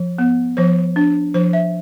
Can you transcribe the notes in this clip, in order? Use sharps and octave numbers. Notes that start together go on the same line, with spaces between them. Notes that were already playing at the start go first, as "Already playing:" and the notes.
Already playing: F3
B3
F3 C5
D4
F3 C5
E5